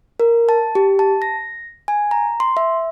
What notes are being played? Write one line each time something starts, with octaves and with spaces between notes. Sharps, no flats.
A#4
A5
G4
A5
A#6
G#5
A#5
C6
E5